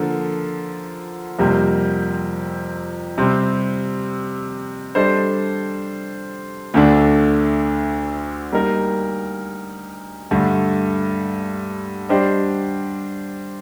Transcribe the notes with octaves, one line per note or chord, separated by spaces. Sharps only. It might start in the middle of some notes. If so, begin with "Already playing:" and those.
Already playing: D3 F3 A#3 F4 A4
F2 C3 G3 A#3
C3 G3 C4
G3 D4 A4 C5 D#5
D2 D3 A3 D4
G3 A#3 D#4 A#4
G2 D3 A3
G3 D4 G4 C5 D#5